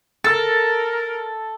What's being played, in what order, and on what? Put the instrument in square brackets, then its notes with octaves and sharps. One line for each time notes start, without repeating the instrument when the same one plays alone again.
[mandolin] A4 [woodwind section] A#4 [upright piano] E6 A6